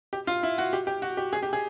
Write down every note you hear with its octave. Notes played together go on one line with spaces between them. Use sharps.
G4
F4
E4
F#4
G4
G4
F#4
G4
G#4
G4
G#4